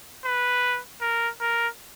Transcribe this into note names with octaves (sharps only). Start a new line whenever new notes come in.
B4
A#4
A#4